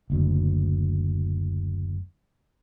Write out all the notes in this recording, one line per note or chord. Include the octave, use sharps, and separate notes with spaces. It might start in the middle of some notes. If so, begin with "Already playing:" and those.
F#1 D2